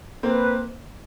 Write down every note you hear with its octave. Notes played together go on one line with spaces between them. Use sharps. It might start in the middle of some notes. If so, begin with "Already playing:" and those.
A#3 C4 B4